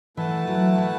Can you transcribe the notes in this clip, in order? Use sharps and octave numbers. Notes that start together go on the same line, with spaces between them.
E3 A3 E4 B4 F#5 A5
F#3
E3